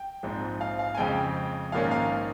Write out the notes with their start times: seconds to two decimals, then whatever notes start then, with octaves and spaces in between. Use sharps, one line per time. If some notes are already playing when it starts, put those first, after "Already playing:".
Already playing: G5
0.23 A#1 G#2 F3 C4
0.61 F5
0.79 F5
0.95 G#5
0.98 F2 C#3 G#3 C4 G5
1.72 A#1 G#2 D#3 A#3 C#4 F5
1.91 F5